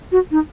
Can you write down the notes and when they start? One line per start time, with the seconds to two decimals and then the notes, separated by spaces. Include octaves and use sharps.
0.12 F#4
0.31 D#4